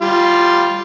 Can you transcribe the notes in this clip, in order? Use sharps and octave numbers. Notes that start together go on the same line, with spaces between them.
G3 F4